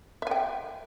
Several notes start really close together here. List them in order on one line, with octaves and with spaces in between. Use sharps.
E5 G#5 G5